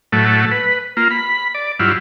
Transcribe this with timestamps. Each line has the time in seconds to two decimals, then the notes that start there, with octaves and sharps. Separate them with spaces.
0.12 A2 F#3 A3
0.51 B4
0.97 A#3 F4
1.11 B5
1.55 D5
1.79 G2 F#3 E4 F4